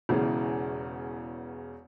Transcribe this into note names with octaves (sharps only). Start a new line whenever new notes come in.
E1 E2 C#3 E3